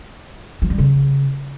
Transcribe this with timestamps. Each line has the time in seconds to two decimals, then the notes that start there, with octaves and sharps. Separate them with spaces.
0.62 F3
0.70 G3
0.78 C#3